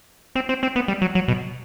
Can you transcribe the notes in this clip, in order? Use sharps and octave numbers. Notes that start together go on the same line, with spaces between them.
C4
C4
C4
B3
G3
F#3
F#3
B2